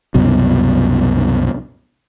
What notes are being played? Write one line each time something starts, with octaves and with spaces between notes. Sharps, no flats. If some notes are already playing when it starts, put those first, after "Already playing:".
C2 F#2 B2